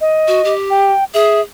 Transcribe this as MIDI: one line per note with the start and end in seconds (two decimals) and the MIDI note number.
0.01 0.53 75
0.28 0.44 66
0.44 0.92 67
0.70 1.04 79
1.14 1.40 68
1.14 1.41 76